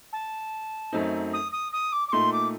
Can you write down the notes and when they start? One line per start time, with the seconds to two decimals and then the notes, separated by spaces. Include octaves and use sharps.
0.13 A5
0.93 F#2 F#3 A3 C4 D#4
1.33 D#6
1.52 D#6
1.73 D#6
1.93 D6
2.08 D6
2.12 A#2 A3 D#4 C6
2.33 D6